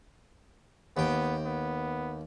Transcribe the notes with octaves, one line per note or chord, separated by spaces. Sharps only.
D#2 B3 G5
B3